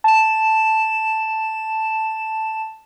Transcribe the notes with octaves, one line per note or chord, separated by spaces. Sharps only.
A5 E7